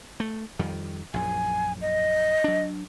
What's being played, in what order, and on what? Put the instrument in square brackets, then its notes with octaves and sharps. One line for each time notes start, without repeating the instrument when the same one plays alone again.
[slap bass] A3
F2 D#3 G3
[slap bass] A#1 F#2 [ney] G#5
[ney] D#5
[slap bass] F#3 D4